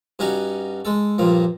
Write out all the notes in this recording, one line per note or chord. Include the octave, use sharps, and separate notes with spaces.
G2 C#4 D#4 F#4
G#3 A4
G2 A#2 F3